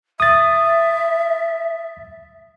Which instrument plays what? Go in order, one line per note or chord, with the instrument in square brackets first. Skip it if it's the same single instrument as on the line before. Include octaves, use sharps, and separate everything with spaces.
[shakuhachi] E5 [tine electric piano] D#6 A6